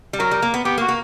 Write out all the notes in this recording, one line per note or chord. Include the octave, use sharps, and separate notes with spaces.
G3
F#3 A#4
G3
A#3
B3
B3 G4
A#3
F#4
A#3